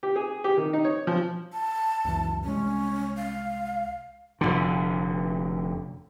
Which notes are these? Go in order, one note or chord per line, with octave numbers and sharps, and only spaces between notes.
G4
G#4
G4
D#3
D#4
C#5
F3
A5
C#2 F#2 E3
C2 G#3 C#4
F5
F1 B1 D3